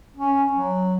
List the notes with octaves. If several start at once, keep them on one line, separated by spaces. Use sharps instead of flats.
C#4
F#3